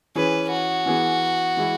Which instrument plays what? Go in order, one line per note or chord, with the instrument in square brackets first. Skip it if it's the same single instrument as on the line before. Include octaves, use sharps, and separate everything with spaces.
[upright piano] E3 C#4 G#4 [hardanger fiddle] B4
[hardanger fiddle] F#4
[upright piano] E3 B3 G#4
E3 G#3 E4